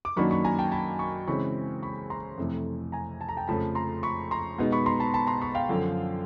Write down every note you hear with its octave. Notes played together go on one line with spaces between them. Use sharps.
D6
F#2 D#3 F#3 A#3 D4 B5 C#6
B5 C#6
G#5 A#5
G5 A5
A5 B5
B5 C#6
C#3 E3 G#3 C4 B5 C#6
B5 C#6
A#5 C6
F2 C3 E3 A3
G#5 A#5
A5
A#5
G5 A5
F2 C#3 F3 A3 A5 B5
A#5 C6
B5 C#6
A#5 C6
B2 G#3 B3 D#4
B5 C#6
A#5 C6
A5 B5
A5 B5
A#5 C6
B5 C#6
F5 G5
F#2 D3 F3